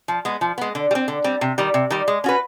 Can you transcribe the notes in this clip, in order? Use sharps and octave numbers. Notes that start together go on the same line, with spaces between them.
F3
G#3 B3
F3
G#3 B3
D3
G3
C4
D3
G3 C4
C3
D#3 G3
C3
D#3 G3
G#3
C#4 F#4 B4